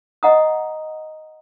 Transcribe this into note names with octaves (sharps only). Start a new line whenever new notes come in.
D#5 F#5 A#5 D#6